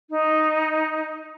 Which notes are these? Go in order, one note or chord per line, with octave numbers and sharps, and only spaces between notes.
D#4